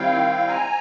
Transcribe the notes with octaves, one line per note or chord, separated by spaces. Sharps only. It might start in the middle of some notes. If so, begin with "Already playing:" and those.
Already playing: D#3 G3 C4 E4 F5 G5
G#5 A#5